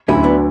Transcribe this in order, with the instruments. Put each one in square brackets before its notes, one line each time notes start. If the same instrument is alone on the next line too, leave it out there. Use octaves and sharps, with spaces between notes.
[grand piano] D2 D3 F#3 [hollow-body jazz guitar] C#4 E4
[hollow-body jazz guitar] B3 D4